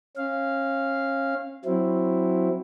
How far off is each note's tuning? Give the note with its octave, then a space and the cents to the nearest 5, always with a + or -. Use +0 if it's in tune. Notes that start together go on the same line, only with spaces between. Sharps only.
C#4 -35 F5 -10
F#3 +0 C4 +0 E4 +0